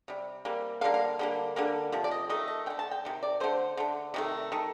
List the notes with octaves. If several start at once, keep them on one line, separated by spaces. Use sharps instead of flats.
C3 G3
C3 G3 A#3
D3 G3 A#3 F5
F5
D3 G3 A#3
D3 G3 A#3
C3 F3
D5
D#5
D#3 A3 D#5
D#5
D3 A3 G5
A5
G5
C3 D#3
D5
D3 A3 C5
D3 A3
C3 D#3 A3
D#3 A3